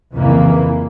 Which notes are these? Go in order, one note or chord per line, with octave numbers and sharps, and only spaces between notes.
F2 C#3 E3 A#3